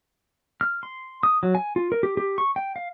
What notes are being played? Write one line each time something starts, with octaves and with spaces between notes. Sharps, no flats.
F6
C6
D#6
F#3
G#5
F4
A#4
G4
G4
C#6
G5
F5